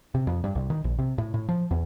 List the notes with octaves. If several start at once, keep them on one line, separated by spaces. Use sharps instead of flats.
C3
F2
G2
C2
D#3
A#1
C3
A2
A2
F3
E2